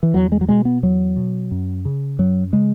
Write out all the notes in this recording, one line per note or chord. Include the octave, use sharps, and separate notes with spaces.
E3
E2 F#3
G#3
F#3
B2 G#3
B3
E2 F#3
B2
F#2
C#3
F#2 F#3
C#3 G#3